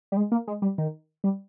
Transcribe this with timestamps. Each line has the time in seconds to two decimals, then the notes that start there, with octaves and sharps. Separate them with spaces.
0.12 G3
0.17 G#3
0.32 A#3
0.48 G#3
0.62 G3
0.78 D#3
1.24 G3